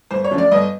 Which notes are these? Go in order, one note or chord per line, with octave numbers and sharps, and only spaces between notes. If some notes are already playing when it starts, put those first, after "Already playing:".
G1 C5
C#5
F#2 D3 F3 A3
D5
G1 D#5